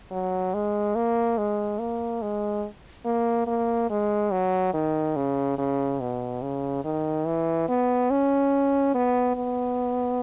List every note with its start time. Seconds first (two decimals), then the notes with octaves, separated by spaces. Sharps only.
0.11 F#3
0.54 G#3
0.96 A#3
1.38 G#3
1.79 A#3
2.22 G#3
3.06 A#3
3.47 A#3
3.91 G#3
4.32 F#3
4.74 D#3
5.17 C#3
5.58 C#3
6.01 B2
6.42 C#3
6.85 D#3
7.27 E3
7.69 B3
8.11 C#4
8.95 B3
9.36 B3